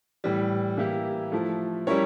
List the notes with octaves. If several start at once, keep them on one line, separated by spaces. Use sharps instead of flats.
A2 E3 G3
E3 A#3 E4 G4
F3 A3 E4
G3 C#4 E4 A#4 C#5